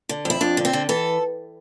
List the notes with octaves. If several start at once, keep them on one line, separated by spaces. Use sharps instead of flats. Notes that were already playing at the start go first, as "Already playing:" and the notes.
D3
F2 E4
F2 D4
D3
C4
D3
E3 A4